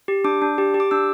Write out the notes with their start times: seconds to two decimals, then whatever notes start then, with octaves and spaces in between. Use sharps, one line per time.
0.08 G4
0.24 D4 D6
0.42 D4
0.58 G4
0.74 G4
0.80 D6
0.91 D4 E6